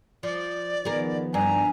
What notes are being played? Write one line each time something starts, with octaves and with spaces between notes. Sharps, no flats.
F3 D5
D#3 F3 B3 G#4 A#4
G2 G#5 A#5